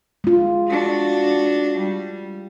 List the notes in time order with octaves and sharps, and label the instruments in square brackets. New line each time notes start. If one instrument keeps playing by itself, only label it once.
[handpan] G#3 F4
[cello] D4 F#4
G3